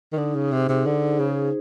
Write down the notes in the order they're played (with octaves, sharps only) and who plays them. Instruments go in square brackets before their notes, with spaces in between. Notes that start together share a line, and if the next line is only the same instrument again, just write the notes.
[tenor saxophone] D#3
[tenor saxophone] D3 [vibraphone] D#4
[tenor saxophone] C#3
[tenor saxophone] C3 [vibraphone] G#4 C5
[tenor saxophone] C3
[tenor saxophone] D3 [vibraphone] D#4
[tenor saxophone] C#3 [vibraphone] G#4 C5